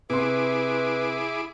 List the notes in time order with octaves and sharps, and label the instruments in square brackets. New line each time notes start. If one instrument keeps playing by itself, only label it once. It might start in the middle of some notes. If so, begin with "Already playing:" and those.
[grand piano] C3 C6 [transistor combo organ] E4 G#4 D6 [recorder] B4